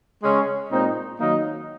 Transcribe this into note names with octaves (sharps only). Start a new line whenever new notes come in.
C#3 G#3 C#4
A#2 G#3 C4 D#4
D#3 F#3 A#3 D#4